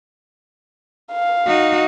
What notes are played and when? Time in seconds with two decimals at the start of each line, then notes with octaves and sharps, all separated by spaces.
1.13 F5
1.47 D#4 F#4